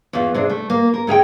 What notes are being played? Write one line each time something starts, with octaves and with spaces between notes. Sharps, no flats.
E2 F4
C3 D4 G#4
A3
A#3
A#4
A2 G#4 F5 G5